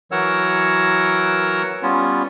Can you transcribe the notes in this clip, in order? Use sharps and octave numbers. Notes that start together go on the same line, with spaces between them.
E3 F#3 A#4 C#5 F#5 E6
G3 B3 C#4 F4